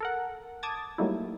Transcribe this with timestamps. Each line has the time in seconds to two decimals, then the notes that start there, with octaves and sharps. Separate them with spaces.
0.01 A4 A#4 F#5
0.63 A5 D6 D#6 G#6 A6
0.98 F#3 G3 A3 A#3 D#4 E4